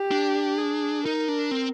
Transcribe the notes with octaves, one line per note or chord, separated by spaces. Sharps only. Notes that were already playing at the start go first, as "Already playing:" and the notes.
Already playing: G4
D4
G#4
D#4 A#4
D4
C4